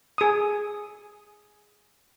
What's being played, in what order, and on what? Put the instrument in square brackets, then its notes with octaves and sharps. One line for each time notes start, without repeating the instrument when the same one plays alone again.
[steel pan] G#4 D#6